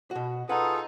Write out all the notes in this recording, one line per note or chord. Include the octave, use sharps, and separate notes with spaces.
B2 F#4
D#4 F4 G#4 A4 B4 F#5